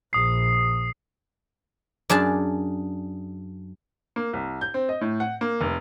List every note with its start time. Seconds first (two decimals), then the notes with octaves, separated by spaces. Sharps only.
0.13 A#1 D#6 C7
2.10 F#2 D4 G#4 A5
4.16 A#3
4.33 C2
4.61 G6
4.74 C4
4.89 D#5
5.01 A2
5.20 F#5
5.41 A#3
5.61 F1